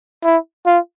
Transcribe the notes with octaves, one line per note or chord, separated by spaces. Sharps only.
E4
F4